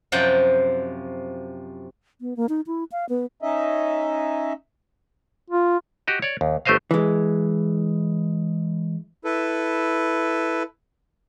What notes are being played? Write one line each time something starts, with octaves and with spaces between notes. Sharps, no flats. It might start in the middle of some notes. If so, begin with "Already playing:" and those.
F#2 C3 F3 F#5 G5
B3
A#3
D#4
E4
F5
B3
C#4 D#4 D#5 E5
F4
F#4 G4 D#5
C#5 D5
D#2
G1 A3 G4 C5 D#5 F5
E3 G#3
E4 A4 B4